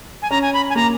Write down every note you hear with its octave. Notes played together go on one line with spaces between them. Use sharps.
G#5
C#4 A#5
G#5
B5
G#5
A#3 A#5